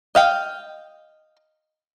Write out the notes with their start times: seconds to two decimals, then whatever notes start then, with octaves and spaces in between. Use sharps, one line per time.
0.15 D#5 F5 G5